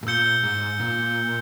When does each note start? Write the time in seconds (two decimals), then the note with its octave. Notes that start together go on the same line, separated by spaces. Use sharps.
0.03 G#2
0.06 A#2 E6 G6 C#7 G7
0.43 G#2
0.80 A#2